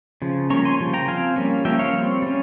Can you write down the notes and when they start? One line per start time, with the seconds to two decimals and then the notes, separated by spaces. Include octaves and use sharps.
0.22 C#3 F3
0.50 G3 A#3 C#4 A#5 C#6
0.65 G#5 C6
0.80 C#3 F3
0.94 G5 A#5
1.08 F3 C4 F5 G#5
1.36 G3 A#3 C#4
1.65 F3 A#3 C#4 E5 G5
1.79 C#5 F5
1.94 G3 C4
2.22 G3 C#4